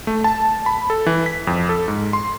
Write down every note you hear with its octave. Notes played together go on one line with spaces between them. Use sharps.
A3
A5
B5
A4
E3
B6
F2
A4
G#2
C6